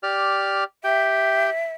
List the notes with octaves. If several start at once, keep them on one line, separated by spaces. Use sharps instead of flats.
G4 D5 F6
G4 E5 G5